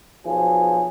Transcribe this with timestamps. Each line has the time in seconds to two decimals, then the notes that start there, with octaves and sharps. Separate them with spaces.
0.25 B1 F3 F#3 G#4